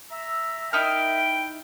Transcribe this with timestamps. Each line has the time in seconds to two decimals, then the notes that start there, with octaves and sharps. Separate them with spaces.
0.10 E5 A#5 E6
0.73 D#4 E4 A#4 D#5 E5 G5 F6